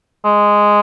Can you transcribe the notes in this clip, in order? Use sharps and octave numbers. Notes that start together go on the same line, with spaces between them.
G#3